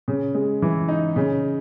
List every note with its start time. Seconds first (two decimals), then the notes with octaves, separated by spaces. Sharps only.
0.08 C#3
0.35 G#3
0.62 E3
0.88 D#4
1.16 C#3